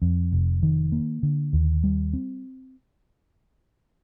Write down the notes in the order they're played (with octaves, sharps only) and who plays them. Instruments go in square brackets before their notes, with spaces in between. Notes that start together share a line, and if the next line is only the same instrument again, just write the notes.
[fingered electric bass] F2
F1
D#3
A#3
D3
D#2
G3
C4